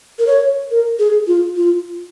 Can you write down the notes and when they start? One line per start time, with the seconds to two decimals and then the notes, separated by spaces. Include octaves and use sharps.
0.19 A#4
0.27 C#5
0.71 A#4
0.99 G#4
1.27 F4
1.57 F4